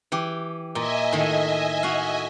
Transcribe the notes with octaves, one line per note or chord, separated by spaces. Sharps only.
E3 G4
A#2 D#5 E5 G#5
A2 D#3
F#4 F5